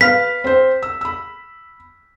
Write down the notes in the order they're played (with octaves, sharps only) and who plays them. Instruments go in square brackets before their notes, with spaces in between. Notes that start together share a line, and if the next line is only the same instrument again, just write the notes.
[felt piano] B4 F5 F6 [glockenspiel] B6
[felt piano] C4 C5
E6
B5 E6